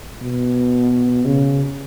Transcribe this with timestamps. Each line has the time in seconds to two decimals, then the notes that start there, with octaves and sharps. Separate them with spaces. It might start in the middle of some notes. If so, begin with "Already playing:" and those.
0.22 B2
1.25 C#3